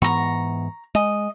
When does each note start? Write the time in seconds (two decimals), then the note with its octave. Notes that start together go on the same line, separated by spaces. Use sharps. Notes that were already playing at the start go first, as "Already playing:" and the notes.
0.02 G#2 E3 B3 A#5 C#6
0.95 G#3 D#5